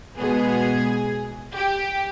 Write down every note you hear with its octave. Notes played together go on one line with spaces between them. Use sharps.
B2 G#3 B3 G#4
G4